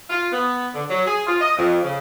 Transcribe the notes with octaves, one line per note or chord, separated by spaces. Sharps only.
F4
B3
D3
F#3
G#4
F4
D#5
F2
C#3